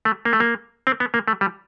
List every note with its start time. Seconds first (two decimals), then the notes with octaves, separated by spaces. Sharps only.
0.05 A3
0.25 A#3
0.33 A3
0.40 A#3
0.87 C4
1.00 B3
1.14 A#3
1.28 A3
1.41 G3